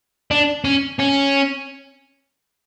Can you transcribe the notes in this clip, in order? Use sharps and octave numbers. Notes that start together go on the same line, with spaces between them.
D4
C#4
C#4